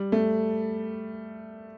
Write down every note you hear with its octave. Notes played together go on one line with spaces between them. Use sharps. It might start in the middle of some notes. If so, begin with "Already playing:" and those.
Already playing: G3
A3